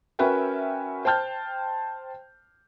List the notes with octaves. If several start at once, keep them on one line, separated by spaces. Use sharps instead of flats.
C#4 F#4 A#4 B4 E5 G5
C5 G5 A5 F6 G6